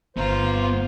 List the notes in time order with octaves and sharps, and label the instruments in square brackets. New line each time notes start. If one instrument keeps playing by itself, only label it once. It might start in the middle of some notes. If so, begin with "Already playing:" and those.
[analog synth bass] G1 [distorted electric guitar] B3 A#5 [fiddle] F4 [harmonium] C5